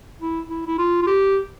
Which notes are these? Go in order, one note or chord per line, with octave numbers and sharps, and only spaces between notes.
E4
E4
E4
F4
F4
G4